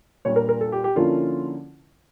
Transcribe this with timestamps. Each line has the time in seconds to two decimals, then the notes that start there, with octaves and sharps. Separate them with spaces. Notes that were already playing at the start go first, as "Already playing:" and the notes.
0.25 A#2 G3 D4 C#5
0.36 A#4
0.49 A#4
0.61 A4
0.72 G4
0.84 G4
0.95 D3 F3 A#3 C#4 E4 F4